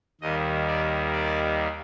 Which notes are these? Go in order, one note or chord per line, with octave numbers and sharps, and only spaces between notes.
D#2 D#3 G3 D#5
D5
D5